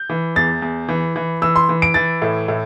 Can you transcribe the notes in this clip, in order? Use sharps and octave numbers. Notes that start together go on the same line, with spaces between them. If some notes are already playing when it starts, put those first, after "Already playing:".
Already playing: G6
E3
E2 A6
E2
E3
E3
E3 E6
C6
E3
D7
E3 A6
A2
A2